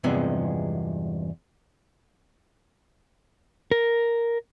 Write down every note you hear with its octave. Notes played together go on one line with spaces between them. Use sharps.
E2 G2 C3 F3 G#3 B3
A#4